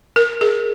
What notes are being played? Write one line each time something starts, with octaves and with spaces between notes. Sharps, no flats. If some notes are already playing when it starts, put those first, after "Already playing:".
A#4
G#4